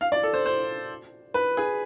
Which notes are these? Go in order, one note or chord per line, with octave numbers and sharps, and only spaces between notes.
F5
D5
A4
C5
C5
B4
G#4